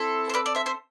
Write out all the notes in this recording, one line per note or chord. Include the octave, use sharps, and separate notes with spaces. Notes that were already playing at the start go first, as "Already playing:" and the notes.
Already playing: C4 E4 A4
C5
B4 D5
D5
C5 E5
C5 E5